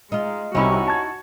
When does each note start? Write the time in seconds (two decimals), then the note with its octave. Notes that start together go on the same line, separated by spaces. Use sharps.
0.12 G#3 D#4 F4
0.55 C2 C3 C#4 D#4 E4 F#4
0.88 A5 G#6